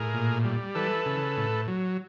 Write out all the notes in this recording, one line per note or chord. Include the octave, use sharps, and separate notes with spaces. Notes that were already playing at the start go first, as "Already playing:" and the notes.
Already playing: A2 G#4 A#4
A#2
G3
E3 A4 B4
C#3
A2
F#3